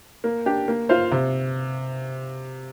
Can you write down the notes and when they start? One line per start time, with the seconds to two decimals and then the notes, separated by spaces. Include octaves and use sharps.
0.24 A#3
0.46 D4 G4
0.68 A#3
0.89 F4 C5 F5
1.11 C3